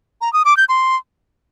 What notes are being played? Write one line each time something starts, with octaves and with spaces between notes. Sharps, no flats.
A#5
D#6
D6
G6
C6